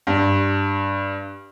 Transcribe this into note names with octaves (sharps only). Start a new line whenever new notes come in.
G2